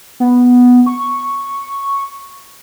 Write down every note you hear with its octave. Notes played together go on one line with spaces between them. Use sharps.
B3
C#6